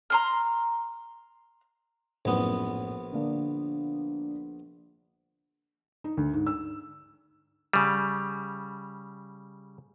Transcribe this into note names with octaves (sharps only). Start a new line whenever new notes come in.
A#5 C6 F6
A#1 F#2 A2 B3
D3 A#3
D#4
D2
G#2
E6
C#3 G3